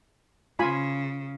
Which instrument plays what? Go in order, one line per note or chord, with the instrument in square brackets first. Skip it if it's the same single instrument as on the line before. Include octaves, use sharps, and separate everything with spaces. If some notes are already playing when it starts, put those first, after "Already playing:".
[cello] C#3 [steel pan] F4 G#5 B5